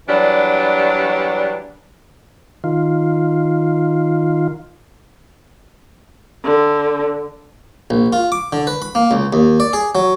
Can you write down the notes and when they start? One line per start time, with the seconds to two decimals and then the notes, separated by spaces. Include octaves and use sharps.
0.08 E3 F#3 G3 D4
2.64 D#3 F4
6.43 D3
7.90 A#1
8.13 F4
8.32 D6
8.53 D3
8.67 B4
8.82 B5
8.95 A#3
9.11 C#2
9.33 D#2
9.60 D5
9.73 G#4
9.95 F#3